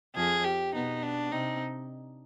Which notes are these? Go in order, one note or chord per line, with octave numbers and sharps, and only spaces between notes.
F2 F3 G#4
G4
B2 B3 D#4
D4
C3 C4 D#4